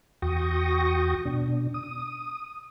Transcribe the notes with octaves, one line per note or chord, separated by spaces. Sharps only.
E2 F#4 G5 C#6 D#6 A#6
B2 D4
D#6